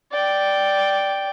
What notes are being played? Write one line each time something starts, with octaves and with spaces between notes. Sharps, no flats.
D5 G5